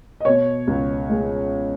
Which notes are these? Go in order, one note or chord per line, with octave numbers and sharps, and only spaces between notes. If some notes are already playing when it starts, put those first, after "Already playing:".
D#5
B2 C#5
C#2
G#3